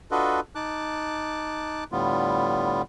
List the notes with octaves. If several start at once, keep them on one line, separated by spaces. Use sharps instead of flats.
D4 F4 F#4 A4 B4 D#5
D#4 A5 D6 F#6
A2 D3 G3 B3 F4